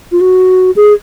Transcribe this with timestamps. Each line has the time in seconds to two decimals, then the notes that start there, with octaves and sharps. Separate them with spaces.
0.12 F4
0.21 F#4
0.76 G#4